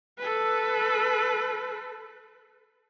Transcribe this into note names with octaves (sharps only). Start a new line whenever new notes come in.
A4 B4